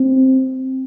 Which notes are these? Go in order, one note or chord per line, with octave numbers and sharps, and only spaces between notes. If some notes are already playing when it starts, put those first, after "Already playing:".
Already playing: C4